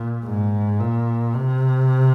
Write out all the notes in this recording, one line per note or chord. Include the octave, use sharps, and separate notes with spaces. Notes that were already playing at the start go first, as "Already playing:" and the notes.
Already playing: A#2
G#2
A#2
C3